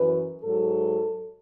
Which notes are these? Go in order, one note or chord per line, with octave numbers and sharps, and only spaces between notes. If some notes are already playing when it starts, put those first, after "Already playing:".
Already playing: F#2 E3 B4
G#2 F#3 A4